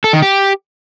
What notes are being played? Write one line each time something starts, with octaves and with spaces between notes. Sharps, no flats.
A4
D#3
G4